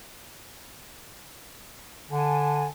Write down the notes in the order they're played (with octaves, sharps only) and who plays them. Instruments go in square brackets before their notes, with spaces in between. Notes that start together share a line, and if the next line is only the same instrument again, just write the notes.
[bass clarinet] D3 [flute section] G#5 A5